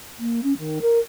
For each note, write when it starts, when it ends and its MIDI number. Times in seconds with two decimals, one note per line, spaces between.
0.19 0.40 58
0.43 0.56 61
0.57 0.78 51
0.81 0.99 70